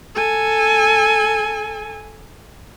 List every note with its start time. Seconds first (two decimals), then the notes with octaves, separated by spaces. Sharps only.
0.15 A4 G#5